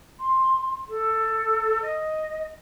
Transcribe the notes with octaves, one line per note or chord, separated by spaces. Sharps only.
C6
A4
D#5